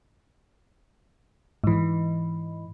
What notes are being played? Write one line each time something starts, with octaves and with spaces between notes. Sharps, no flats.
G#2 E3